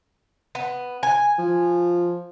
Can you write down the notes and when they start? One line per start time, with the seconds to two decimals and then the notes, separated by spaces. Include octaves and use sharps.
0.55 B3
1.03 G#5
1.38 F3